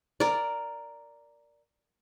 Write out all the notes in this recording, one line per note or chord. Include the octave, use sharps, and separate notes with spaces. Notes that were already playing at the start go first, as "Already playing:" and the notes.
A#4 D5